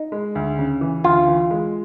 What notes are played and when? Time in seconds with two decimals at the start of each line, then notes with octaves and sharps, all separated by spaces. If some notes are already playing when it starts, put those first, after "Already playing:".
Already playing: D#4
0.12 G#3
0.35 D2
0.58 C#3
0.81 E3
1.04 D2 F4
1.28 E3
1.51 G#3